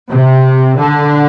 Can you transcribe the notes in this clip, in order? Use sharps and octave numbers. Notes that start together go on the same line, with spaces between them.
C3
D3